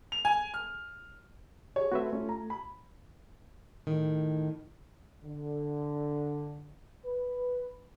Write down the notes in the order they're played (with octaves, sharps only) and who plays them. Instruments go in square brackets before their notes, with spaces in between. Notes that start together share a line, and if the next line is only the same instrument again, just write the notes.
[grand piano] F7
G#5
F6
G#4 C#5
[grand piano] A3 C4 [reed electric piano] F#4 B4 E5
[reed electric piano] A3 [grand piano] C#4 F4
[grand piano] A#5
B5
[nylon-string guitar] A2 D#3
[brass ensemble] D3
B4